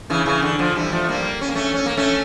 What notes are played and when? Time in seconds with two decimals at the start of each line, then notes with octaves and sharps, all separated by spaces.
0.10 C#3 E3
0.26 C#3 E3
0.42 D3
0.59 D3 F3
0.76 E3 G3
0.92 F3 A3
1.04 A3
1.09 G3 A#3
1.41 C#4
1.49 A#3
1.55 A3 C#4
1.74 C#4
1.86 A#3
1.97 A3 C#4